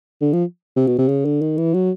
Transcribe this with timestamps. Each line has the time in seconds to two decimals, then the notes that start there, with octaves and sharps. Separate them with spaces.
0.22 D3
0.33 F3
0.76 C3
0.87 B2
0.98 C3
1.09 C#3
1.25 D3
1.41 D#3
1.58 E3
1.74 F#3